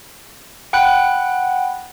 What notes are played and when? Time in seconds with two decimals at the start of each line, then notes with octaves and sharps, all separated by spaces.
0.73 F#5 G5 B5 F#6